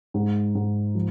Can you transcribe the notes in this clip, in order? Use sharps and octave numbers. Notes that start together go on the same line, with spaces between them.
G#2
G#2
F3